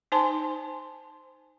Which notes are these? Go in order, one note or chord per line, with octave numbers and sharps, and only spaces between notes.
D#4 C5 G#5 A5 C6